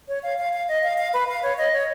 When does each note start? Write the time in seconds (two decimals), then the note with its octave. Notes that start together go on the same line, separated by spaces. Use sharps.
0.08 C#5
0.23 F5
0.38 F5
0.53 F5
0.68 D#5
0.83 F5
0.98 F5
1.13 B4
1.28 F5
1.43 C#5
1.58 D#5
1.73 C#5